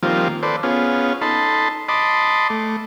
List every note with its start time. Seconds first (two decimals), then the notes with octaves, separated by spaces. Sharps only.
0.03 D#3 F3 G3 A#3 C4 F4
0.43 A4 B4 C5 D5
0.63 B3 C#4 F4 G#4
1.22 D#4 A4 A5 B5 C6
1.89 D#5 A5 B5 C6 D6
2.50 A3